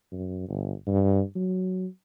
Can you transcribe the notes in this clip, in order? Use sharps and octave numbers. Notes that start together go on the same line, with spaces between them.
F#2
G1
G2
F#3